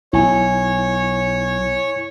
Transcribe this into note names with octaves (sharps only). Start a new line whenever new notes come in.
B1 E4 C#5 G#5